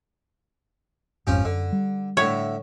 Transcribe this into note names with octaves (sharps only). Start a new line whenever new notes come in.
G#1 F2 G#2 F3 C#4 G4
F#2 D3
G3
A2 D3 E4 C#5